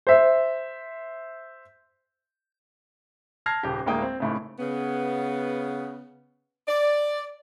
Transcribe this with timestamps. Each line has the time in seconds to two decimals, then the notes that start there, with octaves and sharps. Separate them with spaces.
0.07 C5 E5
3.46 A5 F6 G#6 A#6 C7
3.63 D#1 C#3 G4
3.86 D2 A2 G#3 A#3 G5 D#6
4.02 C4
4.20 G#1 A2 C#3
4.58 C#3 B3
6.68 D5